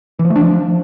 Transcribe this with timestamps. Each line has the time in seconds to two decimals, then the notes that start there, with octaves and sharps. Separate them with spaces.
0.19 E3
0.25 F3
0.30 A3
0.36 D4
0.41 F3